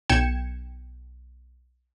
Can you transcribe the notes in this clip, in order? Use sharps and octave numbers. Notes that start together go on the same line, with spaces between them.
B1 G5 G#6 C#7 E7